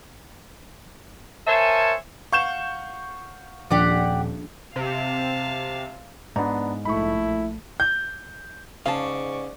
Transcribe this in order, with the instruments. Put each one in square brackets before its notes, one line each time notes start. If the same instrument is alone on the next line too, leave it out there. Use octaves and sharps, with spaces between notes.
[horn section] A#4 C5 C#5 E5 G#5 A5
[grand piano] F5 F#5 [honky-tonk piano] C#6 G6 E7
[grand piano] D#1 [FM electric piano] F3 D4 [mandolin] G4 D5 F#5
[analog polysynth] C3 [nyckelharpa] F5 A5
[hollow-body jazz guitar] G#2 [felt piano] B3 D4 A#5
[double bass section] A#1 A3 [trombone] E4 [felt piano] B5 C#6
[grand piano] G6
[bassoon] G#2 [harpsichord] C#3 [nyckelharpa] D5 C#6 [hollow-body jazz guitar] F5 A5